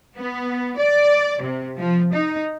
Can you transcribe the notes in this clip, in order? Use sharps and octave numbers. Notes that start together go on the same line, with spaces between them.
B3
D5
C3
F3
D#4